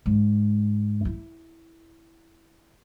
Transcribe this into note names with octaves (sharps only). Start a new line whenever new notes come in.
G#2
E4